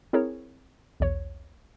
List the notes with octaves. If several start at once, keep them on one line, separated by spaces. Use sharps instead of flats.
C4 E4 G#4 A#4 C#5
B1 E2 C#5